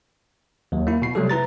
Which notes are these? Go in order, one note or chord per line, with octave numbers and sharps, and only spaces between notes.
D#2 F#3
A#3 E4
B2 C7
C3 F#3 G3 A3 G4 A4
E4 B4 A#5 A6